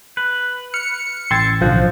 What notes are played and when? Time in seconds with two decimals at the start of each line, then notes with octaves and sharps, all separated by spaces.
0.17 B4
0.74 F6 C#7
1.31 A1 G5 C6 E6 G#6 A6
1.61 B1 D3 F3 F#4 C5 D#5